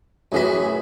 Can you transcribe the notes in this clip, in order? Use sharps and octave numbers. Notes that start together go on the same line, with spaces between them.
A1 F#2 E3 F#4 G#4 B6